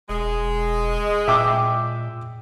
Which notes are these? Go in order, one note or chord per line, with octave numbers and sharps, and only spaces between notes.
E1 G#3
A#2 E5 G5 D6